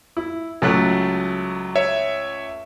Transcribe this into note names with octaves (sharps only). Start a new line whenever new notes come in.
E4
C#2 F#3 A3 F#6
C#5 E5